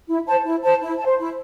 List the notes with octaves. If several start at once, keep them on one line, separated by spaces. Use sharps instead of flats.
E4
C5 A5
E4
C5 A5
E4
A5
C5
E4